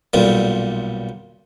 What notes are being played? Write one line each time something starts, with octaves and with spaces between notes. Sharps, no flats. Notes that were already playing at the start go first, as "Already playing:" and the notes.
B1 A#2 G3